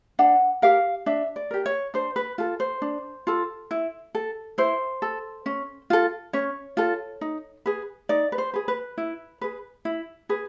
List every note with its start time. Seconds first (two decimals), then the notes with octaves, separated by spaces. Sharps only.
0.19 D4 F#5
0.62 G4 A#4 F5
1.06 D4 E5
1.36 D5
1.51 G4 A#4
1.66 C#5
1.94 D4 C5
2.16 B4
2.38 F4 A4
2.60 C5
2.82 D4
3.27 F4 A4
3.71 E4
4.15 A4
4.58 E4 C5
5.02 A4
5.46 C#4
5.90 F4 A4
6.33 C#4 C#5
6.77 F4 A4
7.21 D#4
7.66 G#4 B4
8.09 D#4 D5
8.32 B4
8.38 C5
8.54 G#4 B4
8.68 B4
8.98 E4
9.41 G#4 B4
9.85 E4
10.29 G#4 B4